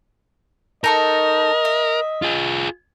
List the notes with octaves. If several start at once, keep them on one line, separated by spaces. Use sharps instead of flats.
D#4 A4 A#4 D#5 C#6
E5
F4 G#4